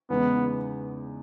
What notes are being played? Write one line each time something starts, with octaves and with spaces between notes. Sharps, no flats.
E2 C#3 G#3 B3 D#4